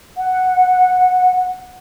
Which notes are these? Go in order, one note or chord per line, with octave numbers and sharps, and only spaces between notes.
F#5